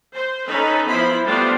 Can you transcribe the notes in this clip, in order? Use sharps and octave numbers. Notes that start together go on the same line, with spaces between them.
C5
C#4 D#4 A4 B4
F3 B3 E4 C5 B5
G3 A3 B3 D4 F4 C5